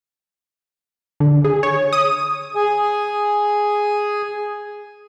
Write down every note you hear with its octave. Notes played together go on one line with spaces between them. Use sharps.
D3
G#4
C#5
D#6
G#4 G#5